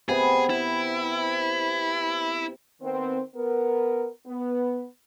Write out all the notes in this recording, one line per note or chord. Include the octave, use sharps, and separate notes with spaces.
C3 B3 G#4
E4
D#3 B3 C4
B3 A#4
B3